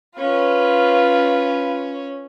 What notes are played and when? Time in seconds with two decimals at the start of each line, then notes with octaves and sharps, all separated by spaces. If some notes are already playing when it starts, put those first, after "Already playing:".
0.18 C#4 F4 B4